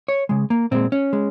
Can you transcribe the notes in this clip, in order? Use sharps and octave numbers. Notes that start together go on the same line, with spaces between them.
C#5
C#3 G#3
A#3
A#2 G#3 C4
C#4
G#3